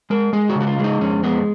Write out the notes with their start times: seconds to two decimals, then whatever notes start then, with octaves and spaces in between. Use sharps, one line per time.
0.10 G#3 A#4
0.33 G#3 G#4
0.49 F#4
0.55 C#3
0.61 F#4
0.67 F4
0.79 G#3
0.84 D#4
1.01 F2 C#4
1.24 G#3 B3